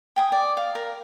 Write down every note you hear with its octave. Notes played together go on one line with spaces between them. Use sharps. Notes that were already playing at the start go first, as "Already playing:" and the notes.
G5 G#5 D#6
D5
F5
A#4